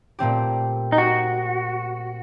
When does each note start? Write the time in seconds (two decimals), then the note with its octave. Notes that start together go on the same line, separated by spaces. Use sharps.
0.19 A#2 A3 C4 G4
0.92 D#4
0.98 F#4